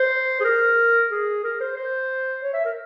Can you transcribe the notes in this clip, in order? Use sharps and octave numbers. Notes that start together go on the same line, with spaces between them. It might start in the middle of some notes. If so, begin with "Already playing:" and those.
Already playing: C5
G#4
A#4
G#4
A#4
C5
C5
C#5
E5
A#4